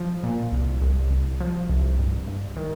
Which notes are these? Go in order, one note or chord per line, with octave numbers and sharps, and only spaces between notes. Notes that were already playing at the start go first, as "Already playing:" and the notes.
Already playing: F3
A#2
C2
C2
C2
F3
C2
G2
G2
D#3